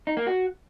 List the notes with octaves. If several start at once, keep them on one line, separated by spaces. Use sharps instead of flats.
D#4
A#3
F#4